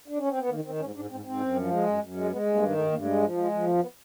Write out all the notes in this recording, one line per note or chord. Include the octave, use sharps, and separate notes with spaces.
D4
C#4
C4
B3
D#3 A#3
D#3 C4
G#2 C#4
G#2 D4
G#2 C4
G#2 C4
F#2
F3
G#3
F#2
F#2
G#3
G#3 B3
G2
A#3
D#3
G2 A3
G2 A#3
A3
G#3
F3
G#3
F3
F2 A3
B3